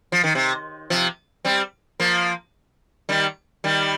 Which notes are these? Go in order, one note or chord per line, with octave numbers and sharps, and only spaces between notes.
F3
D#3
C3
C3 F3
G3 C4
F3 A#3
D#3 G3
D#3 G3